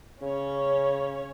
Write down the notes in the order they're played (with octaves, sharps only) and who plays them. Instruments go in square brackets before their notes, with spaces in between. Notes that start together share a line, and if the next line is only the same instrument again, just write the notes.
[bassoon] C#3 [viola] C#4 C#5